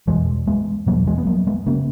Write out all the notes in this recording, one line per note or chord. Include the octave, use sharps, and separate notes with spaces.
E2 B2 E3 G#3
G#3 B3
E2 B2 F#3 A#3
E3 G#3
B3
F#3 A#3
G#3 B3
C#3 A#3 C#4